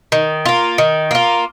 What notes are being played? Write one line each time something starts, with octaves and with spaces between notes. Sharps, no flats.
D#3
A#3 F4
D#3
A#3 F4